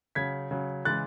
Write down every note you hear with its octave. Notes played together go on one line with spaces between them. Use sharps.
C#3 F#3 G#6 B6
C#3 F#3
C#3 E3 G#3 F#6 A6